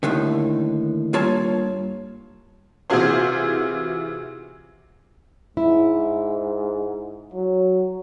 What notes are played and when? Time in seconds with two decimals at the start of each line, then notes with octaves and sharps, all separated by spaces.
0.03 D#2 A2 D3 D#3
1.13 G2 A#3 F4 C#5 A5
2.90 C3 E3 F4 F#4 G#4 C5
5.57 G#2 E4
7.34 F#3